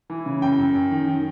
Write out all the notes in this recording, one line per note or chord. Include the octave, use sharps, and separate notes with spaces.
E3
C#3
F#2 G5
F#2
F#2
D#3
D#3